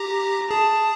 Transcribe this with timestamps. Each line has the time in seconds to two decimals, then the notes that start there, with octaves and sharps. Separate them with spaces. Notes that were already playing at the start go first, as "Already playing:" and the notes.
Already playing: G4 A#5
0.51 G#4 A5